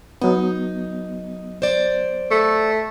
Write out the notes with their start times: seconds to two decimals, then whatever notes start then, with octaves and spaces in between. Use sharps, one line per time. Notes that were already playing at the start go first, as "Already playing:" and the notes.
0.22 F#3 B3 D#4
1.62 C5 D5
2.31 A3